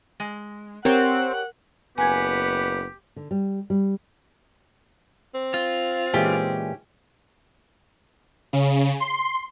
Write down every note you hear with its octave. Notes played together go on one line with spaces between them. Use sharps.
G#3
C4 G4 A#4 C#5 F#5
F#1 B3 G4 G#5 G#6
D3
G3
G3
C4
F4
A#2 E3 G#3 C#4 G4
C#3
C6